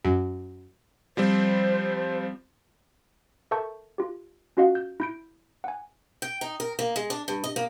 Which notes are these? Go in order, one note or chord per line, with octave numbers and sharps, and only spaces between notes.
F#2
F3 G3 C4 C5
A4 A#4 E5 A5 C#6 G6
F4 G4
C#4 F4 F#4 D#5 F5 F#5
G6
E4 G6 D7
F#5 G#5
G5
D#4
A#4
A#3
G#3
D4
G2
D#5
A#3